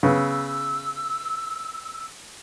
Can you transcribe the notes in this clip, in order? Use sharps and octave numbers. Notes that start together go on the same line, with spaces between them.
C#3 B3 E6